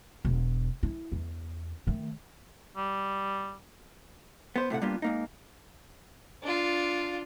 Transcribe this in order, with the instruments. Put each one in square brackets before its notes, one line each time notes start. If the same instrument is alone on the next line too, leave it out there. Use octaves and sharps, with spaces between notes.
[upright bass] E1
E4
E2
D#3 A3
[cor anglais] G3
[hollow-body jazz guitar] B3 C5
A2 C3 A4 F#5
G3 A#3 B3 D4 F4 G4
G#2 A#3 D#4
[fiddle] D4 F4